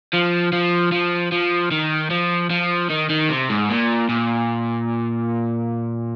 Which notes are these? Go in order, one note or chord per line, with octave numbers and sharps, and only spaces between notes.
F3
F3
F3
F3
D#3
F3
F3
D#3
D#3
C3
G#2
A#2
A#2